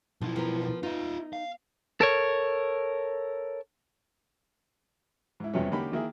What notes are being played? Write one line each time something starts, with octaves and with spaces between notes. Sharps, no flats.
B1 F3 E4
F3 B3 A#4
D#4 F4 E5
F5
A4 A#4 C#5
G#2 E4
E2 G2 C3 F3 B3 C#4
D3 A#3 C#4 D#4 G4 B5
D#3 A#3 E4 G#4